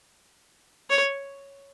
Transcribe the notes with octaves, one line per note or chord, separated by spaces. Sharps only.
C#5